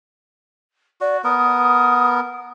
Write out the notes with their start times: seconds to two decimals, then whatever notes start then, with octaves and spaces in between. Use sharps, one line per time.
1.01 F#4 D5
1.24 B3 A#4 D#6